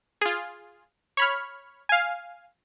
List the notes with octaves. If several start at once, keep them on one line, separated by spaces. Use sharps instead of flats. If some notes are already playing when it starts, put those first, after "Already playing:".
F4 G#4
C#5 B5 F6
F5 G#5